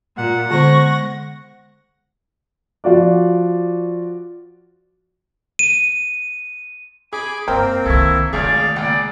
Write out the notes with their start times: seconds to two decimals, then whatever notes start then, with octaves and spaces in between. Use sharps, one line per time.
0.18 A#2 F#5
0.51 D3 G#3 B3 C5 C#6 A#6
2.84 F3 F4 F#4 D5
5.59 D#7
7.13 G#4 G#5 B5 D6
7.48 F#2 A#3 C4 C#4 A#4 C5 G5
7.86 C2 D#3 E4 A4 C#6
8.33 G#1 D2 D#3 A3 G#4 D5 F5
8.76 C#2 A#2 D5 G5